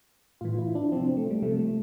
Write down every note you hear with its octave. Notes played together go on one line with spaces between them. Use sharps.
A2 E3 F4
E4
D4
C3 F3 C4
C4
A3
G3
C3 F3 A3
A3